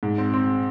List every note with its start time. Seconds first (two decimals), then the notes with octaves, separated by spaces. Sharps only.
0.03 G#2
0.18 C4
0.34 C4